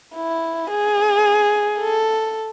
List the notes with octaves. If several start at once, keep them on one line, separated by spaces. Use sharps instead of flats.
E4
G#4
A4